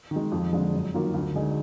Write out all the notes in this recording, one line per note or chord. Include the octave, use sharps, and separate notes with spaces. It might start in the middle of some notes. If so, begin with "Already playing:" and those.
D#3
G#3
F2
D3 F3 G#3
F#2
D#3 F#3 A#3 F4
D2
D3 G#3 D#4 G#4